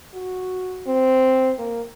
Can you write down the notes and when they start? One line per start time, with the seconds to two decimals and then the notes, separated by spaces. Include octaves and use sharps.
0.14 F#4
0.87 C4
1.58 A#3